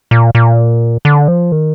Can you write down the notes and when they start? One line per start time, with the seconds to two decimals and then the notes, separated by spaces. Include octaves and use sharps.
0.11 A#2
0.35 A#2
1.05 D3
1.28 F3
1.52 D#3